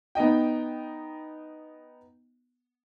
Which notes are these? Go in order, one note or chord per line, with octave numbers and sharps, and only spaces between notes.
B3 D#4 D#5 G5